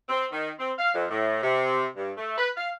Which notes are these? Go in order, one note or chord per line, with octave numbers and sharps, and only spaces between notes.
C4
D#3
C4
F5
F2
A2
C3
G2
A3
B4
F5